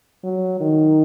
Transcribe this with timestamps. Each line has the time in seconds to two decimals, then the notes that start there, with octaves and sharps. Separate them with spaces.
0.24 F#3
0.60 D#3